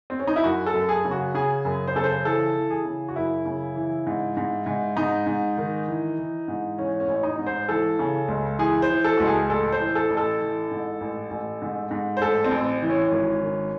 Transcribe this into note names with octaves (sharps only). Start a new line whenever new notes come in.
C4
C#4
D#4
E4
F#2 F#4
A4
F#2
G#4
C#3
F#4
C#3 G#4
F#2
C5
C#3 A4
C5
E3 A4
E3
G#4
C#3
F#4
F#2 E4
C#3
E3
G#2
G#2
G#2
G#2 D#4
G#2
D#3
E3
E3
G#2
E3 C#4
C#4
A1
D#4
G#2
C5
E3 A4
C#3
C#2
E3 G#4
C5
E3
A4
C#2 F#4
G#4
A1 A4
C5
E3
A4
A1
A4
E3
G#2
A1
A1
G#2
G#2
C5
A1 A4
C4
A1
E3
C#4
G#1
D#3